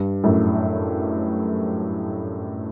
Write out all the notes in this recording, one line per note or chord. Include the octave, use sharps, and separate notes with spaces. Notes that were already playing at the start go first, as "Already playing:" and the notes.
Already playing: G2
F#2 A2